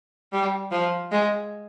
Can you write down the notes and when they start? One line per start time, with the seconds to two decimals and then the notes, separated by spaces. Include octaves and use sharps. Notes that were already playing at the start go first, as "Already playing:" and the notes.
0.33 G3
0.71 F3
1.12 G#3